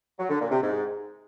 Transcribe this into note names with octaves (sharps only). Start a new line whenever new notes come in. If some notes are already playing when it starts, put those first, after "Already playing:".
F#3
D3
A#2
C3
G#2